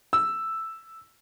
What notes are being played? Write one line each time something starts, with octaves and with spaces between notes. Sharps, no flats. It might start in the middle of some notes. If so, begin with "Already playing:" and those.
E6